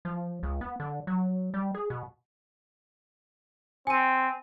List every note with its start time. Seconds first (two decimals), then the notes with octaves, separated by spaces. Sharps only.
0.05 F3
0.43 C#2
0.61 B3
0.80 D3
1.07 F#3
1.54 G3
1.75 G#4
1.90 B2
3.87 C4 G#5 D#7